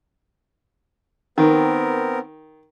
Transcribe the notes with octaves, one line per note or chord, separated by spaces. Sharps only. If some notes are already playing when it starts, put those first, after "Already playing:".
D#3 B3 C4 A#4